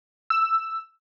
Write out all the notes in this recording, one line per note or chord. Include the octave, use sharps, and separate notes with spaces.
E6